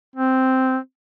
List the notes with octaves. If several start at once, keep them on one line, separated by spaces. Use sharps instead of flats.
C4